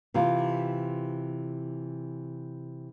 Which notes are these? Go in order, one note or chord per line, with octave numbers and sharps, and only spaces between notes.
C3 E3 F4